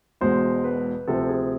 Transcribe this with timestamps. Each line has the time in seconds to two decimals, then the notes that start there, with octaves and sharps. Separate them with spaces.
0.21 E1 E2 B2 G#3 C5
0.64 B4
1.08 D2 C3 F3 A4
1.29 G#4